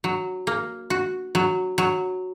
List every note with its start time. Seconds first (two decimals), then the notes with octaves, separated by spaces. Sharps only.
0.04 F#3
0.47 A#3
0.90 F#4
1.35 F#3
1.78 F#3